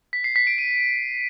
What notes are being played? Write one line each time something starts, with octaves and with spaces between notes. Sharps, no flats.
B6
C7
B6
D7
D#7